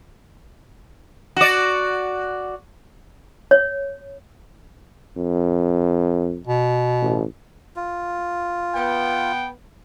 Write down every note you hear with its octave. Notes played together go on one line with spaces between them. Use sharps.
F#4 D5
C#5
F2
B2
A1
F4
B3 G5